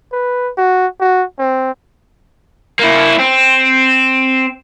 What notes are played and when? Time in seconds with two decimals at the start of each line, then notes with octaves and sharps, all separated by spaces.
0.12 B4
0.57 F#4
1.00 F#4
1.39 C4
2.79 A#3 E4
3.19 C4